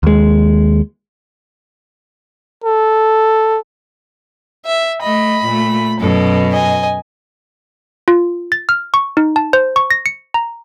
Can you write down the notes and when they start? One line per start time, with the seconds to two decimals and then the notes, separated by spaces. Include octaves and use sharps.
0.03 D#2 G#3
2.64 A4
4.66 E5
5.02 A3 D#5 B5
5.45 A#2 A3
6.00 F#2 B2 A4
6.52 D#5 G#5
8.08 F4
8.52 A6
8.69 F6
8.94 C#6
9.17 D#4
9.36 A5
9.53 C5
9.76 C#6
9.91 A#6
10.06 C#7
10.34 A#5